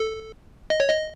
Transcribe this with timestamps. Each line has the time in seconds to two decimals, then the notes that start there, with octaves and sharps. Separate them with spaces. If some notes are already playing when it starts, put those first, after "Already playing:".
Already playing: A4
0.70 D#5
0.80 C#5
0.90 D#5